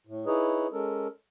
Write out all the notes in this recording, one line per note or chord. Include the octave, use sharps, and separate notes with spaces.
A2
D#4 E4 G#4 B4 C#5 D#5
G#3 C#4 A4 A#4